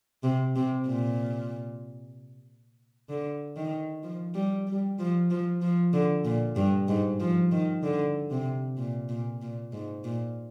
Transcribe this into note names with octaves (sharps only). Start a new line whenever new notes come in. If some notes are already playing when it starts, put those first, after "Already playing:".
C3
C3
A#2
D3
D#3
F3
G3
G3
F3
F3
F3
D3
A#2
G2
G#2
F3
D#3
D3
C3
A#2
A#2
A#2
G#2
A#2